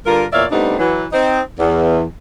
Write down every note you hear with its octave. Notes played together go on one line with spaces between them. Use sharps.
G2 D3 F4 A#4
E2 A#2 C#5 D5 E5 F5
G3 A3 B3 C4 D4 D#4
E3 F#3
C4 D#4
E2